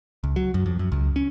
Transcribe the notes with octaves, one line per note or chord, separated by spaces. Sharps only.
C#2
F#3
F#2
F2
F#2
C#2
C#4